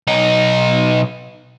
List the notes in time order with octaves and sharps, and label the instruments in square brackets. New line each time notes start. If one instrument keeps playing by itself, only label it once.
[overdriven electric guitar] B1 D#4